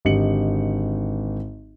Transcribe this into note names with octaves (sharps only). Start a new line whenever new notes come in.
G#1 D3 G4 D#5 C#7 F#7